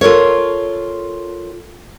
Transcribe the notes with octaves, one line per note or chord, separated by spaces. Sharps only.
F4 A4 A#4 C#5